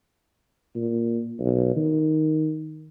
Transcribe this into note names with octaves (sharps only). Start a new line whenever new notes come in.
A#2
B1
D#3